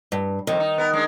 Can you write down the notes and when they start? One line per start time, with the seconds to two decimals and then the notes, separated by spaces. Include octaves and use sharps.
0.12 G2
0.47 F2 C3 D#3
0.60 D#4
0.78 B3 A#4
0.93 G#3 D4 A#4